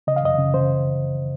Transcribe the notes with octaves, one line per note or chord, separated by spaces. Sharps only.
C#3 D#5
F5
F#2 D#5
C#3
C#3 C5